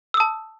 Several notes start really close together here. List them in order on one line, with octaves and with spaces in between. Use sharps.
E6 D#6 A5